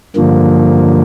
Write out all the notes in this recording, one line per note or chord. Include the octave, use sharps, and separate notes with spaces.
G2 D3 F3 A#3